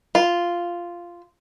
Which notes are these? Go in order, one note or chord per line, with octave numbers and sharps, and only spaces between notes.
F4